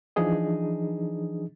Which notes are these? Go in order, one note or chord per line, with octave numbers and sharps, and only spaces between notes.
E3 F3 D4 D#4 G#4 D#5